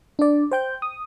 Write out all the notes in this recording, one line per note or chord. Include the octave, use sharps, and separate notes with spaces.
D4 D5
C5 G5 G6
D#6